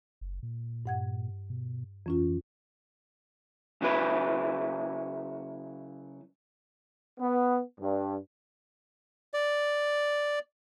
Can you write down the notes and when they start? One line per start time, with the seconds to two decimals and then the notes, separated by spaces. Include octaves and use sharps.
0.21 F#1
0.43 A#2
0.86 G2 A#2 F#5 G#6
1.50 B2
2.06 F2 E3 C#4 F4
3.82 C#3 F#3 E4 B4
7.20 B3
7.81 G2
9.34 D5